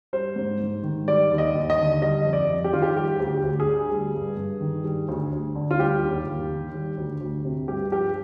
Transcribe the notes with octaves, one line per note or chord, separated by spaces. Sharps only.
G3 C5
G#2
G#2
D#3
G3 D5
D#2
D#5
D#2
D#5
D3
G3 D#5
F2
D5
F2
G4
D#3 F4
G4
G3 G4
D2
G4
D2
G#4
D3
G3
G2
G2
D#3
G3
D2
D2
D3
F4
G3 G4
D#2
D#2
D#3
G3
D2
D2
C3
G2 G4
F3 G4